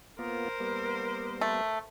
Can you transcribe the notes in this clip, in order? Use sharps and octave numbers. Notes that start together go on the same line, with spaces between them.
A#3 B3 F4 A#4 C5
G3 A#3 B3
A3